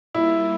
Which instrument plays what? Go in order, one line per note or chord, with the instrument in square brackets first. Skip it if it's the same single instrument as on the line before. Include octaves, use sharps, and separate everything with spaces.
[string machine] G3 A#3 F4 [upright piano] E4